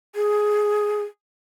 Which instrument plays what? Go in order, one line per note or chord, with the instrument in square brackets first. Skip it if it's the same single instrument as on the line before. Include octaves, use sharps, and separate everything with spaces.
[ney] G#4